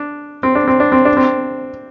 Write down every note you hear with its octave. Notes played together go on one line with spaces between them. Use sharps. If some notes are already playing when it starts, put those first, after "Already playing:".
Already playing: D4
C4
D4
C4
D4
C4
D4
C4